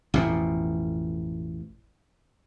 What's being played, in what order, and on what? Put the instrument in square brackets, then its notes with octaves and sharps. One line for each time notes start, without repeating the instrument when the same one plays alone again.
[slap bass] A1 F2 B2